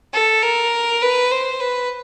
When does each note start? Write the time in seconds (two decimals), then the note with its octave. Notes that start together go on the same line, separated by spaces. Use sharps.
0.14 A4
0.43 A#4
1.02 B4
1.31 C5
1.60 B4